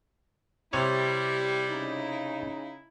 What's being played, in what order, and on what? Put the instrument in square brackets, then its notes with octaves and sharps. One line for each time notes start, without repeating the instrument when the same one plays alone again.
[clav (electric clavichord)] C3 C#5 [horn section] G3 [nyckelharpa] E4
[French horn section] C#3 D#4